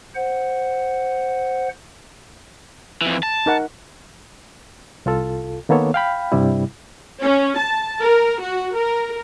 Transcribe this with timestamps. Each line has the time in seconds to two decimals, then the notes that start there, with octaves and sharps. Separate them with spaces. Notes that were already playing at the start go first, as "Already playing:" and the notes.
0.15 C5 F#5
3.01 F2 E3
3.23 A5
3.46 D#4 A#4 F#5
5.06 C2 F4 A4
5.69 D#3 A#3 B3 A4 C#5
5.94 F5 G5 B5
6.32 G2 C3 G3 E4
7.23 C#4
7.60 A5
8.01 A#4
8.42 F#4
8.75 A#4